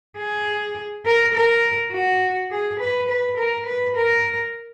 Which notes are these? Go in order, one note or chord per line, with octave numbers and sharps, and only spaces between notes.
G#4
A#4
A#4
F#4
G#4
B4
B4
A#4
B4
A#4